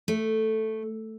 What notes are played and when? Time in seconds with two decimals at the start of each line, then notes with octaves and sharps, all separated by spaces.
0.08 A3